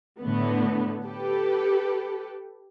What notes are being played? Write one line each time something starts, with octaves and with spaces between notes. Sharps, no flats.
A2 D3 A3 B3
G4 A4 B4